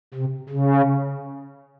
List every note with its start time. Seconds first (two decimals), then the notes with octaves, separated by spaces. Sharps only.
0.14 C3
0.50 C#3